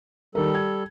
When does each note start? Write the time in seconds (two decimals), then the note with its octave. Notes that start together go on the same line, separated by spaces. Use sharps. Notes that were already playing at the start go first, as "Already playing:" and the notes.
0.35 D#3 G3 A4 A#4
0.55 G#6